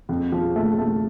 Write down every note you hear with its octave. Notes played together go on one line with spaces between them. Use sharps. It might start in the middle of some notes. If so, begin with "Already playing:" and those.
F2
F3
A3
A3